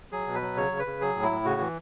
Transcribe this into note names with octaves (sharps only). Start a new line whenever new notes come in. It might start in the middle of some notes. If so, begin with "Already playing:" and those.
F#3 G#4
B2
B4
F#3
C#3 C#5
C#3
B4
C#3
F#3 G#4
A2
E4
A2
C#3 F#4
E3